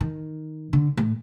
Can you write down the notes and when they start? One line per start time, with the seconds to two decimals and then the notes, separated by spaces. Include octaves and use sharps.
0.01 D#3
0.73 D3
0.97 A2